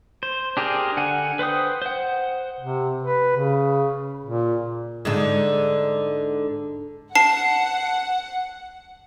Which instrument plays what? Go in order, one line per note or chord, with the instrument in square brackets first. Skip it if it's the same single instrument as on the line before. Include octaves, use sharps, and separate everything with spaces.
[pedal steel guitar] C5
D4 G4 G#4 A#4 C5
D3 F#5 G#5
B4 C5 G5 D#6
C5 F#5
[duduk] C3
B4
C#3
A#2
[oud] G#2 D3
[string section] F#5 [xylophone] A5 C7